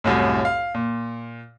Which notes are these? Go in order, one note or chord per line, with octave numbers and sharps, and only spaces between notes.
C2 F#2 A2
F5
A#2